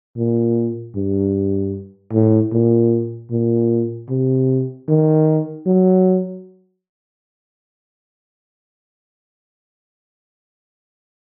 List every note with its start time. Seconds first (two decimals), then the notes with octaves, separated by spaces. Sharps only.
0.17 A#2
0.96 G2
2.13 A2
2.52 A#2
3.31 A#2
4.10 C3
4.89 D#3
5.66 F#3